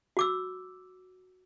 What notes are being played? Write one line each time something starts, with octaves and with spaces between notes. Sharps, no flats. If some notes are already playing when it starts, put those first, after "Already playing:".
F#4 D6 E6